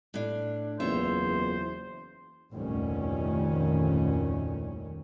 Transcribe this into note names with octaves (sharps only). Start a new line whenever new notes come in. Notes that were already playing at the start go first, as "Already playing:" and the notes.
A2 D4
F#1 E2 F4 C5 C#5 E5
F1 D2 A#2 D#3 G3 C#4